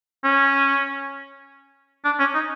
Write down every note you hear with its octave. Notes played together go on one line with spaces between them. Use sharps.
C#4
D4
C#4
D#4